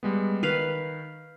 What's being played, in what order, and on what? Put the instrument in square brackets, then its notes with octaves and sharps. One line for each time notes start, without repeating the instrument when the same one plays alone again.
[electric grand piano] G3 G#3 B3
[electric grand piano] D#3 [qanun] B4 F5